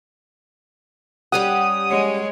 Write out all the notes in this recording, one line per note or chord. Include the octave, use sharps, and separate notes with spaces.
G3 C#4 G4 F#5 D#6
G#3 C#5